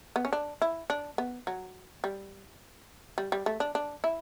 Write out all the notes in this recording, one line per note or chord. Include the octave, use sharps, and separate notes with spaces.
B3
C#4
D4
E4
D4
B3
F#3
G3
G3
G3
A3
D4
D4
E4